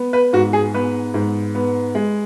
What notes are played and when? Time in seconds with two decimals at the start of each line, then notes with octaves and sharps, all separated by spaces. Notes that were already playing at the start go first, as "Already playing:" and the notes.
Already playing: B3
0.13 B4
0.33 G#2 F#4
0.53 G#4
0.74 B3 B4
1.14 G#2
1.55 B3
1.95 G#3